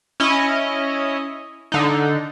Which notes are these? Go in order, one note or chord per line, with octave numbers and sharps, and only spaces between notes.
C#4 E4 D#5
D3 D#4